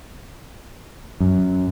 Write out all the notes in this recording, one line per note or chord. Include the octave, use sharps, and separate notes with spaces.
F#2